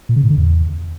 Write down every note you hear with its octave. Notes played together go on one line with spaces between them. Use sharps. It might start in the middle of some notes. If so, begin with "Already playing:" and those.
A#2
C#3
A2
D3
E2